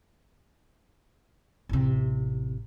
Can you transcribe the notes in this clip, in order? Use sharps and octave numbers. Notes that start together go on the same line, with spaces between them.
A1 C3